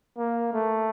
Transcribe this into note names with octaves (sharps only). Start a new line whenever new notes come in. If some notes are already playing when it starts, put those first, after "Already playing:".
A#3
A3